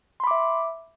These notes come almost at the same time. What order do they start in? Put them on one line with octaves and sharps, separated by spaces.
C6 B5 D6 E5